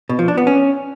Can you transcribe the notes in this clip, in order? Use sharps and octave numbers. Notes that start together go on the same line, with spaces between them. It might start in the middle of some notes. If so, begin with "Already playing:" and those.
B2
F3
D4
B3
C#4